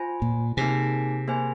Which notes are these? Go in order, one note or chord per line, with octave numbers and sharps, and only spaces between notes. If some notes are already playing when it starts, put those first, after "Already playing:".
Already playing: F4 C5 G#5
A#2
C3 A#3 D#4 G#4 C5 G#5
A#3 G#4 C5 G#5